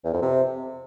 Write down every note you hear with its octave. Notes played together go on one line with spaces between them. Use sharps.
E2
F2
C3